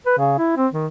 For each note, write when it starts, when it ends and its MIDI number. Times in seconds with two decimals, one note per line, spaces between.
0.06 0.14 71
0.18 0.35 49
0.38 0.54 64
0.57 0.68 60
0.73 0.87 51